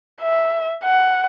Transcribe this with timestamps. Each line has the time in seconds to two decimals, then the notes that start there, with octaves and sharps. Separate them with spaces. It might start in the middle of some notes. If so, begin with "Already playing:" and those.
0.21 E5
0.83 F#5